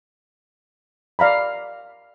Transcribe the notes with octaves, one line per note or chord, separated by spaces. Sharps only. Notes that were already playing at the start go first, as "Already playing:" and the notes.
D5 F5 A#5 B5